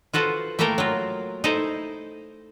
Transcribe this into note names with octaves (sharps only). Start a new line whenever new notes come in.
F4 F#4 A4 B4 C5
A3 A#3 E4 A4 A#4 G5
F#3 F4
D#4 E4 A4 C5